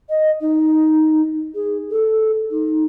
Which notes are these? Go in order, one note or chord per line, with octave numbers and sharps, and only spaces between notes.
D#5
D#4
G#4
A4
D#4